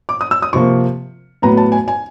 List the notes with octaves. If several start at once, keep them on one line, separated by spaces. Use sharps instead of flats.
D6
D#6
E6
D#6
C3 F3 A#3 C#6
A2 F#3 B3 A#5
A5
G#5
G#5